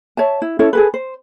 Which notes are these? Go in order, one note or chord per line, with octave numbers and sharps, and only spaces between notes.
C#5 E5 A5
E4
C#4 E4 A4 C#5
G#4 A4 B4
C5